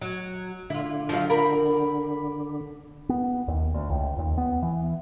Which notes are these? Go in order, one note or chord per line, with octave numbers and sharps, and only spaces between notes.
F#3
D3 E4 F4
F3 F#3 F5
A#4 B5
B3
D#2
D2
C#2
D#2
B3
E3